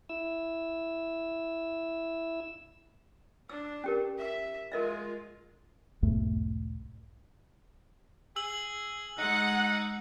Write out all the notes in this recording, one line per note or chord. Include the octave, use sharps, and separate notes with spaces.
E4 E6
D4 E6
C#4 G4 A#4
E5
G#3 F4 A#4 D#5 E5
B1 E2 G#2 A3
G#4 E6 F#7
G#3 D#4 F#5